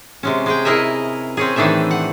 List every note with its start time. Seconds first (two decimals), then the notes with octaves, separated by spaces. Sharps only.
0.23 C3 G#3 C#4
0.46 G#3 G#4 G5
0.65 E4 G#4 A#4 D#5 E5
1.37 C4 C#4 G#4
1.56 A2 D#3 E3 D4 G#4 E5
1.91 F#5